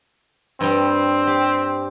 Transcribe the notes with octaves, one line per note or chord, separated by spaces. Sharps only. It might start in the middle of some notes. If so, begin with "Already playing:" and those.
G2 G3 C4
G4